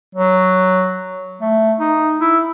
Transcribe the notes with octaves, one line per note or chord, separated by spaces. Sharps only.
F#3
A3
D#4
E4